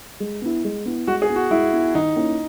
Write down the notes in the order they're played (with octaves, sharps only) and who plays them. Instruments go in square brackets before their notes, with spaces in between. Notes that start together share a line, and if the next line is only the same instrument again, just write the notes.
[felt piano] G#3
B3 E4
G#3
B3 E4
[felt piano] G#3 [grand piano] F#4
[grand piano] G#4
[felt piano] B3 E4
[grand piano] F#4
[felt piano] G#3 [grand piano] E4
[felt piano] B3 E4
[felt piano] D#3 [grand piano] D#4
[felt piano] A#3 C#4 E4